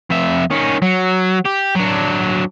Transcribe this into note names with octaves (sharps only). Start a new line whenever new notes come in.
F2 E5
D#3 C#4
F#3
G4
F#3 D4